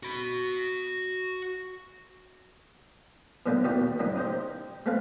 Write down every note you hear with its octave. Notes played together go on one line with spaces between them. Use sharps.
F#4 B5
B2 D3 D#3 F#3 G3 A#3
D#2 B2 E4 F#4 D5 G5
F#2 C#3 F#3 G#3 E4
D#4 G4 C5 D#5
G#3 A3 C4 B4 F5